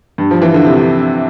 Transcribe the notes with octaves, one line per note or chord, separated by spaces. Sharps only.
G2
F3
E3
D3
C3